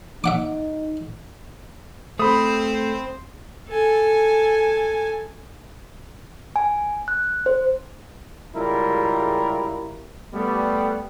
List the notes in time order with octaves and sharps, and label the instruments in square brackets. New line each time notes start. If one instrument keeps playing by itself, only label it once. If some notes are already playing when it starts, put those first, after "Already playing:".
[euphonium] D#4 [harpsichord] E5 F#5 D6
[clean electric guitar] A3 [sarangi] C4 [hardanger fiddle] C5 [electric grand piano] B5 D#6
[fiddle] A4 G#5
[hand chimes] G#5
F#6
C5
[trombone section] C#2 G3 G#3 E4 F4 A#4
G3 A3 B3